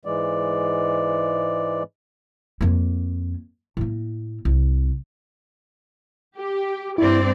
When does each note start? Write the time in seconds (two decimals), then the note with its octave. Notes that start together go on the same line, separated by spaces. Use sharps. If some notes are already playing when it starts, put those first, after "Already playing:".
0.05 G#2 E3 G#3 D5
2.61 F2 A#3
3.77 A2 A#3
4.45 C2
6.37 G4
6.98 G2 C4 E4 D5